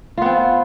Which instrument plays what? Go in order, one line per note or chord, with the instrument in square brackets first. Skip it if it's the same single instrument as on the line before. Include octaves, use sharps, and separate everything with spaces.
[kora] F4
B3
C4